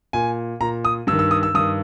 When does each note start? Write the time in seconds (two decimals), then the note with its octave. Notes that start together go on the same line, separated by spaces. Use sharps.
0.13 A#2 G#5
0.61 A#2 A#5
0.85 D#6
1.07 G2 E6
1.12 D#3
1.19 E6
1.31 D#6
1.43 E6
1.54 G2 D#3 D#6